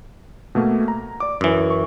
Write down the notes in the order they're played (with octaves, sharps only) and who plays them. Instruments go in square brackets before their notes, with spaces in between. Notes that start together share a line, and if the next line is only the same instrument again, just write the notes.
[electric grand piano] B2 A3 A#3
A#5
D5 D6
[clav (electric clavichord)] F#2 E3
[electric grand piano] C#6